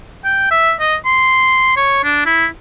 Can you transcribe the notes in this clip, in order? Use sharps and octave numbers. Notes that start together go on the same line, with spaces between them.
G5
E5
D#5
C6
C#5
D4
E4